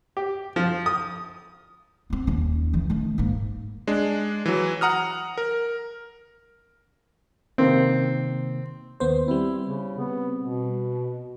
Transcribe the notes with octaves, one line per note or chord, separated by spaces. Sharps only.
G4
F3
D#6
B3 C4
D#2 C#4
C#3 E3
D#3 A3
G#2 A#3
G#3 D4
E3 F#3
F#5 A#5 D#6 F6
A#4
C3 D#3 A#3 C4
D#2 B3 C5
G3 C4 E4
C#3
B3
B2